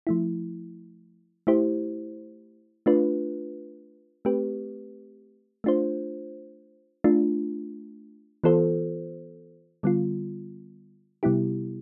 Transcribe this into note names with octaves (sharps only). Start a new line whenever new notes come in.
F3 A3 E4
A3 E4 G4 C5
A3 D4 F4 B4
A3 C4 G4 B4
A3 D4 F4 C5
A3 D4 F4
E3 B3 F4 A4 C5
D3 G3 B3 F4
C3 G3 B3 E4 G4